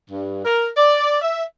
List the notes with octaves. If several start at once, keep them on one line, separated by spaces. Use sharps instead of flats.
G2
A#4
D5
E5